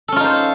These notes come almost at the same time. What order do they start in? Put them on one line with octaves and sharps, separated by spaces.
A4 C#4 F4 D#4 C5